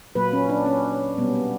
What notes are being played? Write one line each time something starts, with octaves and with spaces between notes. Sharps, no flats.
A#2 F#3 A#3 B4
C#4
D4
C#4
B2 G3 A#3 B3
B3